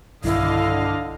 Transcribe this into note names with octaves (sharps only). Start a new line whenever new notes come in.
B1 G2 D3 D#3 D4 E4 D#5 F5